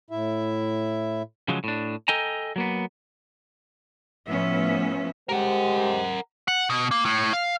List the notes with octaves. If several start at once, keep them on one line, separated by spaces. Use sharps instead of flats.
A2 E4 E5
C#3 F3 F#3 G#3
A2 D4
A4 D#5 G5 G#5 A#5
F#3 A#3 B3
A2 F3 B3 C#4 E5
G#3 G4 A#4 C5 F#5
F#5
B2
A#3
A2
F5